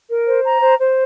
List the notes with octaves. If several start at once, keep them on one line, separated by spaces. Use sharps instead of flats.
A#4
C5
A#5
C5
C5